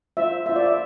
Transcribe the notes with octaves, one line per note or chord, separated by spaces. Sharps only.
F4 C5 E5
F4 C5 E5
D5
E5